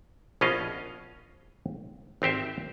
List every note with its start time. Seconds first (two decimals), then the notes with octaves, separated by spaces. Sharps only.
0.41 A#1 B2 C#4 F4 D#5 F5
2.22 G#1 C4 G4 C5 E5